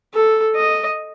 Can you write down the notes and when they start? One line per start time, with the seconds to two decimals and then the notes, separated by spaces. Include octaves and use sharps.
0.14 A4
0.56 D#5